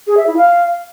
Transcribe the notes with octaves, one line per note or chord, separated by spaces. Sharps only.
G#4
E5
E4
F5